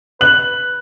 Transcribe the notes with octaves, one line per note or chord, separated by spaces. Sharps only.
B4 F#6 F#7